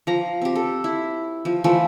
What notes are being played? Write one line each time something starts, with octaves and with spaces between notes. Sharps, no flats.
F3 A#5
C4 G4
A4
E4
F3
E3 F3 A3